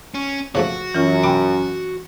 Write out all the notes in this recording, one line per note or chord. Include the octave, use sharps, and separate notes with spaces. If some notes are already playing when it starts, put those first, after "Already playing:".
C#4
C#3 F3 A3 F#4
F#2 E3 C#4 F4
G5 B5 D6